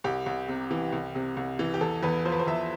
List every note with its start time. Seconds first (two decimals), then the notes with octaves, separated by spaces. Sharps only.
0.04 C2 G4
0.26 C2
0.48 C3
0.71 E3
0.92 C2
1.15 C3
1.37 C2
1.59 E3
1.74 G4
1.81 E2 A4
2.03 E2 B4
2.25 F3 C5
2.32 B4
2.39 C5
2.47 E2 E5